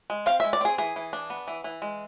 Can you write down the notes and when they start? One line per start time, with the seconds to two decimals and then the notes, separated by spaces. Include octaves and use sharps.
0.10 G#3
0.26 C4 F5
0.40 G#3 E5
0.53 D5
0.61 C4 G#4
0.78 E3 G#4
0.96 E3
1.13 D4
1.30 B3
1.48 E3
1.64 E3
1.82 G#3